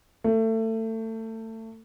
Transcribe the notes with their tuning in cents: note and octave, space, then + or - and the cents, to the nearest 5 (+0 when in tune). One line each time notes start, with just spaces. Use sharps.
A3 +25